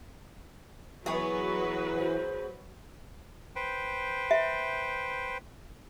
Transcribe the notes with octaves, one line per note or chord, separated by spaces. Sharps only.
E3 F#3 B3 F#4 G#4 B4 C#6
C5
B4 C5 G5
E5